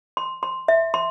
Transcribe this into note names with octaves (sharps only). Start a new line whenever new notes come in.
C6
C6
E5
C6